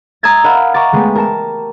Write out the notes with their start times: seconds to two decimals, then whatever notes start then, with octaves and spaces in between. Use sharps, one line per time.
0.23 A#5 D#6 E6 G#6 A6
0.44 A#4 D#5 F5 F#5 B5
0.74 A#5 C#6 D6 A6
0.93 G#3 A3 B3 G4
1.15 A#4 A5 E7